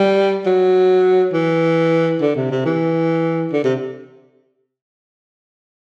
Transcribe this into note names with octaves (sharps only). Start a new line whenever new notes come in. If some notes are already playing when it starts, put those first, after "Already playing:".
Already playing: G3
F#3
E3
D3
C3
C3
E3
D3
C3